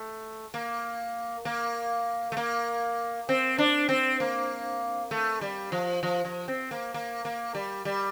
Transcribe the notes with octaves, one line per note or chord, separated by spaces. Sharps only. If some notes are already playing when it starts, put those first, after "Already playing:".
Already playing: A3
A#3
A#3
A3
A#3
C4
D4
C4
A#3
A3
G3
F3
F3
F3
C4
A#3
A#3
A#3
G3
G3